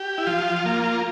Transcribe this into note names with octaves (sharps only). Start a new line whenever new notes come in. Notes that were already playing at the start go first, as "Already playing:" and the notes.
Already playing: G4
E4
F3 F4
A#3